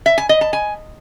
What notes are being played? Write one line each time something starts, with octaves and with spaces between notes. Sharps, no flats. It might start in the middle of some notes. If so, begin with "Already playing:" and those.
E5
G#5
D#5
A5
G#5